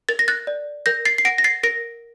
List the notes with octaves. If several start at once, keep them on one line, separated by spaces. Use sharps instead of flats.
A#4 A6
A#6
F#6 A6
D5
A#4 G6 A#6
A6 C7
C7
F#5 A#6 D7
A#6
A6 C7
A#4 A#6 D7